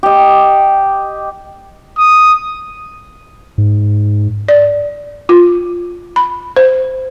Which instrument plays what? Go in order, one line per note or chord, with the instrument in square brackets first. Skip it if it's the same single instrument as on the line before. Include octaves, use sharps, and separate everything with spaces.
[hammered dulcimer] G4 D#5
[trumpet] D#6
[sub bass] G#2
[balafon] D5
F4
B5
C5